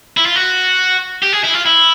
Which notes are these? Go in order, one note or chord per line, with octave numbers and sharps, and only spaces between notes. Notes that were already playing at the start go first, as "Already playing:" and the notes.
E4
F4
F#4
G4
G#4
E4
F4
E4